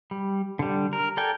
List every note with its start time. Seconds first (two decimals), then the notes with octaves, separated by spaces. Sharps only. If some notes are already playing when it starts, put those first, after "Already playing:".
0.11 G3
0.59 D3 G3
0.93 A#4
1.17 A4 A#4 D5 G5 G#5